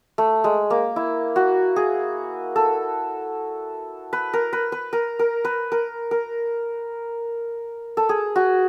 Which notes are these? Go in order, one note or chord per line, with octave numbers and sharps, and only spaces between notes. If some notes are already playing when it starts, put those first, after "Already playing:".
A3
G#3
A#3
E4
F#4
G#4
A4
B4
A#4
B4
B4
A#4
A#4
B4
A#4
A#4
A4
G#4
F#4